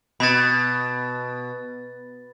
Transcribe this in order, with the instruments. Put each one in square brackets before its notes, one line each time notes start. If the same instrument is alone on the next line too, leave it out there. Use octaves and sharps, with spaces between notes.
[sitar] B2 [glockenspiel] B5 A6